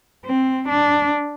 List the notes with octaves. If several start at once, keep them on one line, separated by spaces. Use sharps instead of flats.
C4
D4